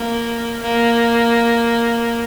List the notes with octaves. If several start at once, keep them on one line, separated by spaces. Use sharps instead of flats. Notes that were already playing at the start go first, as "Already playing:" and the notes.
Already playing: A#3
A#3